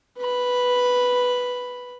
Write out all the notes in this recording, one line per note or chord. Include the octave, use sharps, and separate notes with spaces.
B4 B5